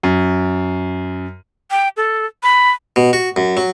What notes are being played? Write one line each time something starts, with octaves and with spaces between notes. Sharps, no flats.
F#2
G5
A4
B5
B2
F#4
F#2
F#3